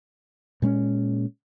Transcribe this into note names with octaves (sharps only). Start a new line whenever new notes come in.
A#2 G#3 C4 C#4